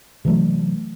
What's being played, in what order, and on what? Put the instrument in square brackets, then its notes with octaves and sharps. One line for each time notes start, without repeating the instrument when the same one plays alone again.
[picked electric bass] C3 E3 F#3 A3